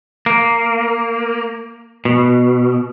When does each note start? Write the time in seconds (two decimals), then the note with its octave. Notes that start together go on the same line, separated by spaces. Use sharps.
0.26 A#3
2.05 B2